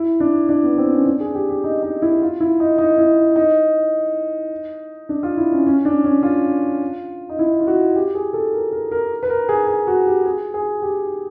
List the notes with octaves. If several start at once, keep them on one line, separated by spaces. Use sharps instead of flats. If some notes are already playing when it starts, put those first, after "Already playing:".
Already playing: E4
D4
D4
B3
C4
C#4
D4
G#4
G4
G4
D#4
D#4
E4
F4
E4
D#4
D#4
E4
D#4
D4
F4
E4
C#4
C#4
D4
C#4
F4
D#4
E4
F4
F#4
G4
G#4
A4
A#4
A#4
A#4
B4
A#4
G#4
G#4
F#4
G4
G#4
G#4
G4